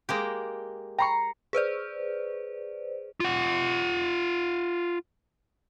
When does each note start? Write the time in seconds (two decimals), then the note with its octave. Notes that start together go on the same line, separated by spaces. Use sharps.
0.09 G#3 A#3 G4
0.99 G5 A#5 B5 C#6 C7 C#7
1.53 G#4 B4 C5 D5
3.20 F4 F#5